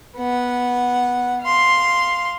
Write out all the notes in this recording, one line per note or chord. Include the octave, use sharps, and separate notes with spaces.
B3 F#5
F5 C6